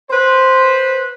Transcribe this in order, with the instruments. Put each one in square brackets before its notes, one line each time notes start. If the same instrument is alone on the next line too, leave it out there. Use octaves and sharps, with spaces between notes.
[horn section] B4 C5